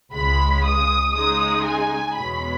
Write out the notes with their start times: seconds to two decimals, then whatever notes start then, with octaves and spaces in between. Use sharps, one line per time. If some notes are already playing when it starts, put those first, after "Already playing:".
0.14 C#2 C#3 G#3 B5
0.64 D#6
1.15 C#3 G#3 D#4 D#6
1.65 G#5
2.16 E2 B2 G#3 C#4 B5